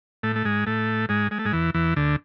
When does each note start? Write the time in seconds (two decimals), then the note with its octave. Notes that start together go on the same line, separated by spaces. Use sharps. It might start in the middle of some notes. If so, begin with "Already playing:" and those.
0.23 A2 A3
0.36 A3
0.45 G#2 G#3
0.67 A2 A3
1.09 G#2 G#3
1.31 G#3
1.39 A3
1.45 G#2 G#3
1.52 E2 E3
1.74 E2 E3
1.96 D2 D3